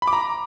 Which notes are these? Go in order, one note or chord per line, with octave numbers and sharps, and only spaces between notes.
B5
D6
A#5